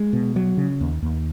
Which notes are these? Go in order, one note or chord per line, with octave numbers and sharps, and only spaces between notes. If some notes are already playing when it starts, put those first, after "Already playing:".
Already playing: G#3
B2
F#3
C#3
D#2
D#2